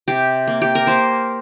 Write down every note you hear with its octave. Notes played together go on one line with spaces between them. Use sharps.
C3 G4
A#3
G4
A#4
A#3 C5